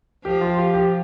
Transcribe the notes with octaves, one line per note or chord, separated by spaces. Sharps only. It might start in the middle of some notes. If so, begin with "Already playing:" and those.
F3 G4
F4
G4
G4